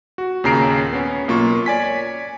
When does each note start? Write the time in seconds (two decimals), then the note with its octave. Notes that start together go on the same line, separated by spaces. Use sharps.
0.18 F#4
0.44 D#2 A#2 C#3 A#5 C7 D7
0.93 B3 C#4
1.28 B1 A#3 F4 C#6
1.66 C#5 D5 G#5 B6